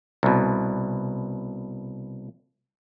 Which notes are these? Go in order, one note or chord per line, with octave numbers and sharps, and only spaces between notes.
C2 B2